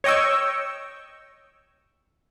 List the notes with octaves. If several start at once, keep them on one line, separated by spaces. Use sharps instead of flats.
C#5 D#5 G5 C#6 E6